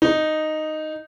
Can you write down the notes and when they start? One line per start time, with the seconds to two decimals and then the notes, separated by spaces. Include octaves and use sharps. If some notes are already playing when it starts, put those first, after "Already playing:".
0.02 D#4